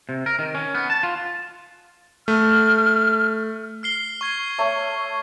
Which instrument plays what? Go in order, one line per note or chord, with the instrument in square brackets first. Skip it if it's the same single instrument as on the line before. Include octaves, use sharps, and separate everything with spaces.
[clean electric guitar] C3
A#4
D#3
C#4
B3
A5
F4
[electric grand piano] A3 [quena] F6
[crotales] F6 C7 G7
C#6 G#6 C7
[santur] A3 A4 C#5